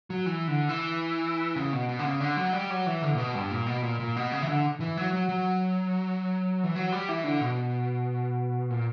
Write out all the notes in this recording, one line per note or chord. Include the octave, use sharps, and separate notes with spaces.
F#3
E3
D3
E3
C#3
B2
B2
D3
C#3
D3
F#3
G3
F#3
E3
D3
A#2
B2
G2
A#2
B2
A#2
A#2
B2
C#3
E3
D3
E3
F#3
F#3
F#3
E3
F#3
G3
E3
D3
B2
A#2